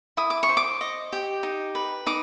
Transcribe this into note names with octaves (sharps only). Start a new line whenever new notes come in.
E4 D#6
D6
C#6
C5
D6
D#5
G4
D#4
B4
D#4 D6